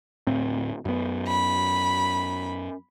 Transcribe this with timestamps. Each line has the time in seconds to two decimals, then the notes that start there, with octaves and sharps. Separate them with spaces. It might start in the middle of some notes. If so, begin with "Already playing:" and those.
0.27 D1 A2 C4
0.85 F#2 B3
1.27 B5